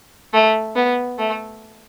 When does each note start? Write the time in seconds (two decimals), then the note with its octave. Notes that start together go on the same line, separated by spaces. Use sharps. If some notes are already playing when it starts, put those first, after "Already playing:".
0.33 A3
0.76 B3
1.18 A3